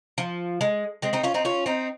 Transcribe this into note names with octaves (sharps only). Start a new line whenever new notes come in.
F3
G#3
G#3 C4
C4 D#4
C#4 F4
C4 D#4
C#4 F4
C4 D#4